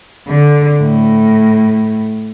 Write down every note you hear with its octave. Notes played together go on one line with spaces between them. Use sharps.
D3
A2